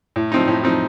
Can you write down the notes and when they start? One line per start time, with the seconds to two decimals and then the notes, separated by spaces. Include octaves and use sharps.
0.16 A2
0.32 F3 C4 D#4
0.48 A2
0.64 F3 C4 D#4